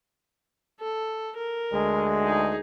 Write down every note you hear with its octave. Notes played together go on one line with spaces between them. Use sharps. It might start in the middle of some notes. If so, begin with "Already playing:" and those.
A4
A#4
D2 G#3
D#4 G#4